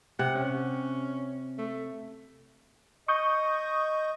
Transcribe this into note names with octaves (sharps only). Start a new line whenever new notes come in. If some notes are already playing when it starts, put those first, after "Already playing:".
C3 F#5
C#4
A3
D#5 C#6 D#6 G6